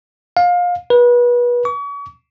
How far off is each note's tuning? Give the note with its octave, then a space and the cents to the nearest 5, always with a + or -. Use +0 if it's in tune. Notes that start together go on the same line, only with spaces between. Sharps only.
F5 +25
B4 -30
C#6 +40